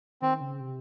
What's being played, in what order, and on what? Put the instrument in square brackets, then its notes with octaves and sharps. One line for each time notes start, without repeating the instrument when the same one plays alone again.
[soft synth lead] D#3 [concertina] C4
[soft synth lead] C#3
C3